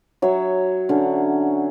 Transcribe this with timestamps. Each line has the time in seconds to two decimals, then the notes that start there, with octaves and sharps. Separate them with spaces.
0.22 F#3 C#5 E5
0.89 D3 C#4